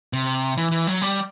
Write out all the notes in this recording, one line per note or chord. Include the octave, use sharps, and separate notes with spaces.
C3
E3
E3
F#3
G3